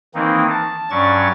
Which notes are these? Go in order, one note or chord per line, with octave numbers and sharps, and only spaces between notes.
D#3 E3 A#3 C4 D#4
A5
G2 F#3 C#4 D5 C#6 A6